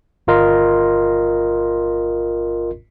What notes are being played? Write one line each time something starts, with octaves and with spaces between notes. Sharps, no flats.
G1 F4 A#4 D#5 C6